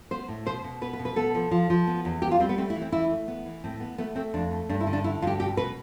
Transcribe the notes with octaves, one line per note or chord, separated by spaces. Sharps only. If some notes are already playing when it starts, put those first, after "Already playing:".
B3 C5
A2
B2 C5
B2
B3 B4
B4
B2
B4
B3 A4
F3
F3
F3
B3
E2
B3 G4
F4
G3 C4
B3
A3 C4
E4
E3
C4
E3 E4
A3
B3
E3
A2 C4
B3
A3 B3
A3 C4
F2 D4
A3
G2 D4
E4
D3
D4
D3 E4
G2 F4 G4
B2 G4
B2 B4